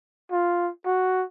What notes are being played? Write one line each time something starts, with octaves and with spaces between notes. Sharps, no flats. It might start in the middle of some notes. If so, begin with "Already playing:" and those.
F4
F#4